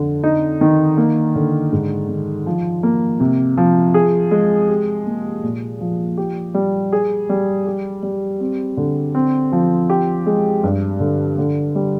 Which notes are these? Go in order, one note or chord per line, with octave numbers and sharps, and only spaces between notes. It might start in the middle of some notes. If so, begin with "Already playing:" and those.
Already playing: F2 D3
D#4
D#3
A#3
D3
G#2
D#3
F3
A#3
C3
F3
G#4
G#3
G4
A#3
A#2
F3
G4
G3
G#4
G3
G4
G3
C4
D3
C4
F3
G4
G#3
G2
D3
D3
G3